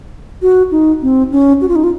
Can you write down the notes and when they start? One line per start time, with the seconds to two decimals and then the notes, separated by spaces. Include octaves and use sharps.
0.42 F#4
0.71 D#4
1.02 C4
1.32 C#4
1.61 F#4
1.68 F4
1.76 D#4
1.84 F4